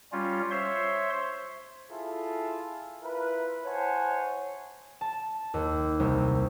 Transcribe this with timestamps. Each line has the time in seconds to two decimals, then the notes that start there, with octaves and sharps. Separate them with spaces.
0.12 G3 C#4 F4
0.51 C5 C#5 E5 C6
1.91 E4 F4 G#4 A4
3.02 E4 F4 A#4 B4
3.65 E4 C5 C#5 F#5 G#5 A5
5.01 A5
5.54 D#2
6.00 C2